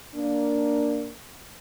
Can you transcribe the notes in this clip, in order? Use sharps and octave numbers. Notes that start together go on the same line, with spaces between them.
A#3 D4